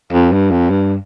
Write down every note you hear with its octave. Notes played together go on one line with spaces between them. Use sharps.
F2
G2
F2
G2